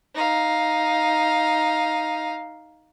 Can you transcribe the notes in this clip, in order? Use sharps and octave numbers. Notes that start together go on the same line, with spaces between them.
D#4 F5